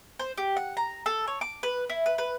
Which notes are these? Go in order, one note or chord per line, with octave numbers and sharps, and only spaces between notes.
C5
G4
F#5
A#5
A4
C#5
D6
B4
E4
B4
B4